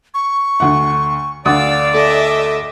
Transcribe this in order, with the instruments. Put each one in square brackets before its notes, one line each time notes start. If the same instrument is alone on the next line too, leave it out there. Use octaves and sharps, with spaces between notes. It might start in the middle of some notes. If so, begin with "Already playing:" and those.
[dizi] C#6
[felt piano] D2 F#5
[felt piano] D2 F#5 D#6 [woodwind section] D5 [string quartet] F5 E6
[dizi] A4 [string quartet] D#5 E5 D6